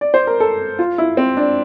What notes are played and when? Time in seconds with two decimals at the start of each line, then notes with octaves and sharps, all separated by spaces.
0.01 D5
0.14 C5
0.27 A#4
0.40 A4
0.79 F4
0.98 E4
1.17 C4
1.37 D4